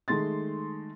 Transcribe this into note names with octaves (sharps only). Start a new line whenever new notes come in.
D#3 G#3 A3 C6 A6